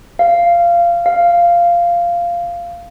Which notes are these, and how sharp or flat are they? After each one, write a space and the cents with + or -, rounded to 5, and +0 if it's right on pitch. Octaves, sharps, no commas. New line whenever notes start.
F5 -20
F5 -10